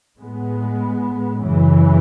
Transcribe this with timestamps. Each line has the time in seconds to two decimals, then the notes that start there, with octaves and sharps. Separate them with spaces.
0.18 A2 G#3 B3
1.39 F#2 C#3 E3